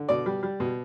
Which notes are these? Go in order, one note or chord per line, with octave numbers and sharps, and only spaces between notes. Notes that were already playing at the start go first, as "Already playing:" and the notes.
Already playing: D3
B2 D5
G3
G3
B2